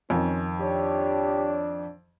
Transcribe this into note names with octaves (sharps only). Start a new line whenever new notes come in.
F2 D#3 C#4
D4 G4 C#5